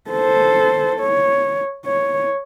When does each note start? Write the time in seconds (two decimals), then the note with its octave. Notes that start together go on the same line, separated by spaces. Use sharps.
0.10 A4 C5
1.00 C#5
1.86 C#5